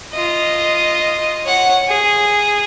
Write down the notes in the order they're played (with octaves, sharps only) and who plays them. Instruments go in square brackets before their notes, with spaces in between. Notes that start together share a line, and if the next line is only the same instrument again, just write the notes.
[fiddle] F4 D#5
C#5 F#5
G#4